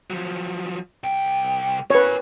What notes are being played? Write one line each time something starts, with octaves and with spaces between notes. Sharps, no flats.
F3 F#3
C2 G5
A#4 B4 C#5 G#5